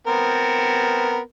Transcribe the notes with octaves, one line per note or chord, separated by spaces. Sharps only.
B3 C4 A#4